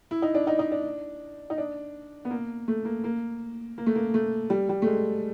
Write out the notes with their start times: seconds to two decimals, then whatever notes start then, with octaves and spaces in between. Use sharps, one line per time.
0.11 E4
0.22 D#4
0.35 D4
0.47 D#4
0.59 D#4
0.72 D4
1.50 D#4
1.58 D4
2.25 B3
2.30 A#3
2.68 A3
2.85 A#3
3.04 A#3
3.78 A#3
3.86 A3
3.95 A#3
4.14 A3
4.50 G3
4.69 G3
4.82 A3
4.87 G#3